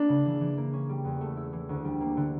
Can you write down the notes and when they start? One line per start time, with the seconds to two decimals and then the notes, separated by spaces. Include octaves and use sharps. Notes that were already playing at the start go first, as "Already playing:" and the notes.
Already playing: A#3 C#4 D4 E4
0.09 C#3
0.26 E3
0.41 E3
0.57 A#3
0.73 C#4
0.89 G3
1.05 E2
1.21 A3
1.37 E4
1.53 E3
1.69 D2
1.85 G3
2.01 A#3
2.17 D3